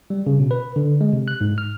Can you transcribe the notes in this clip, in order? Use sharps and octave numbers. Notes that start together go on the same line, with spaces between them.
G3
C#3
B2
B4
D3
G#3
C3
F#6
G#2
F6